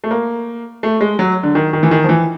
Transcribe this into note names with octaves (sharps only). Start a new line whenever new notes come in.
A3
A#3
A3
G#3
F#3
D3
D#3
D#3
E3
D#3
F3
E3